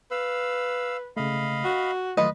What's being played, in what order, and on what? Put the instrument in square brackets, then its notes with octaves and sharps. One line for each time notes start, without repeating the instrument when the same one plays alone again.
[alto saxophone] B4 [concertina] F5 E6
[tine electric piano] C#3 A3 [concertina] D#5 F5 B5
[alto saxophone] F#4 [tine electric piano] F#5
[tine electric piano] D#3 F#3 A3 [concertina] F4 [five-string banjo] B4 D#5